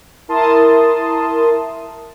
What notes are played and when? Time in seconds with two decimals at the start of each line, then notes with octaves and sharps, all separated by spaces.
0.28 E4 A#4 A5 C6 D#6